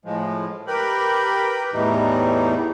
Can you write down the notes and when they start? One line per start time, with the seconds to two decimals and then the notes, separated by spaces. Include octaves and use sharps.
0.05 A2 F3 G#3
0.67 G4 A#4 B4 G5 B5
1.73 E2 A2 E3 G3 D#4